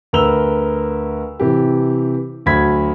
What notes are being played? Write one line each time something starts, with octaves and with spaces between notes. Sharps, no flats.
D2 A#4 B4 E6 F7 G7
C3 E3 G4
D2 F#3 B5 G#6 B6